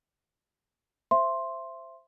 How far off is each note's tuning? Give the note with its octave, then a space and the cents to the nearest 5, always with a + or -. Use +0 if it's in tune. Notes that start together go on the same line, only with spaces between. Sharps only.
C5 +0 E5 +25 C6 +5